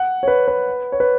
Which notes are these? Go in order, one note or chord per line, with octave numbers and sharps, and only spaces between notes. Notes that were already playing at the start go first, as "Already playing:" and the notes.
Already playing: F#5
C#5
B4
B4
C#5
B4